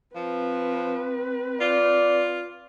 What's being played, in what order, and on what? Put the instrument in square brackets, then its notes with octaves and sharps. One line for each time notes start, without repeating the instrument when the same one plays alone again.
[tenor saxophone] F3 [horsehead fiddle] C4 B4
[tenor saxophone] F4 [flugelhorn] D5